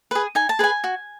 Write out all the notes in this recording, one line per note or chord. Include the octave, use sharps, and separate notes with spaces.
G#4 B4
D#4 G#5
A5
G#4 B4 G#5
F#4